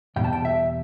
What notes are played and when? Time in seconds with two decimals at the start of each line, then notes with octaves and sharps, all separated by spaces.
0.16 E2 B2 G3 B3 G5
0.24 A5
0.33 G5
0.45 E5